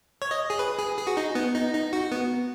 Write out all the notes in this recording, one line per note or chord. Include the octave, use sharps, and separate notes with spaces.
C#5
D#5
G#4
B4
G#4
G#4
F#4
D#4
B3
D#4
D#4
F#4
B3